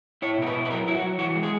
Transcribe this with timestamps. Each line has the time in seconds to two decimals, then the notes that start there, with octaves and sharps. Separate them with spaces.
0.22 E4 C#5
0.38 B2 A#4
0.46 B4
0.54 E4
0.65 B4
0.70 F#3 A#4
0.87 F#3 E4
0.95 F#4
1.02 F#3
1.18 E3 F#4
1.35 G#3
1.43 G#4